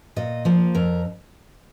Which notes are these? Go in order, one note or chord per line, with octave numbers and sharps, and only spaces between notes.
A#2 D#5
F3 A#3
F2 A#4